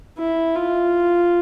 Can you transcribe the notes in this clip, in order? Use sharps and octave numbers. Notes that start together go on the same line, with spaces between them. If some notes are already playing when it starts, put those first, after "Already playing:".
E4
F4